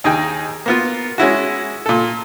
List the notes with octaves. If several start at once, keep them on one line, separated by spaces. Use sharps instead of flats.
D#2 D#4 G#4 G5
A#3 B3 F4
G#3 C#4 E4 F#4
A#2 A4